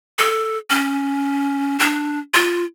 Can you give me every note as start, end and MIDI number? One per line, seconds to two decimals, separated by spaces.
0.19 0.58 69
0.70 1.79 61
1.79 2.19 62
2.34 2.64 65